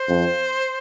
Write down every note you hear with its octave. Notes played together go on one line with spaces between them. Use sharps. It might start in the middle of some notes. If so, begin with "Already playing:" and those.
Already playing: C5
F2